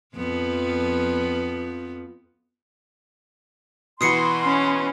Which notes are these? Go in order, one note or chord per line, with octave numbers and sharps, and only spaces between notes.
F2 F3 B3
B2 E3 F#4 B5 C6 D#6 C7 C#7
C#4